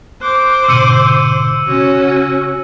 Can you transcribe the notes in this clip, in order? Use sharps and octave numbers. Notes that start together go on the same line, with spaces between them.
C5 D6 F#6
G#2 B2 D3 E6 C#7 D#7
C#3 C#4 F#4